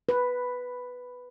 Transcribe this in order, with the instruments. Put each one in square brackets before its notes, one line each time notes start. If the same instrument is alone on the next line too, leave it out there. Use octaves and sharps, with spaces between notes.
[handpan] B4